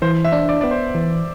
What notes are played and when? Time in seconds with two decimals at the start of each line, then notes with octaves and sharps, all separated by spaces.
0.02 E3 C5
0.25 E5
0.32 D4
0.49 D5
0.61 B3 D5
0.71 C5
0.95 E3